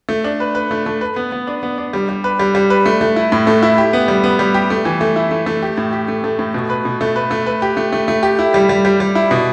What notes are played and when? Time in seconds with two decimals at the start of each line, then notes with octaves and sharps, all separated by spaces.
0.09 A3
0.24 D4
0.40 B4
0.55 B4
0.71 A3
0.86 A3
1.01 B4
1.16 B3
1.32 B3
1.47 D4
1.63 B3
1.78 D4
1.93 G3
2.09 G3
2.24 B4
2.39 G3
2.55 G3
2.70 B4
2.86 A3
3.01 A3
3.16 E4
3.32 A2
3.47 A3
3.63 E4
3.78 G4
3.93 B3
4.08 G3
4.24 B3
4.39 G3
4.54 G4
4.70 A3
4.85 E3
5.01 A3
5.16 E4
5.31 A3
5.46 A3
5.62 G4
5.78 A2
5.93 G4
6.08 A3
6.24 A3
6.39 A2
6.54 B2
6.70 B4
6.85 B2
7.01 A3
7.16 B4
7.31 A3
7.46 B4
7.62 G4
7.77 A3
7.92 A3
8.08 A3
8.23 G4
8.39 E4
8.54 G3
8.69 G3
8.85 G3
9.00 G3
9.15 E4
9.31 B2